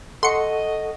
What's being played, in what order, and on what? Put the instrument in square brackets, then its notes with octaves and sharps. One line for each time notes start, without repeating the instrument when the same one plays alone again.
[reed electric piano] A4 F#5 C#6 [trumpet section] D#5 [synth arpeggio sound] C6 C#7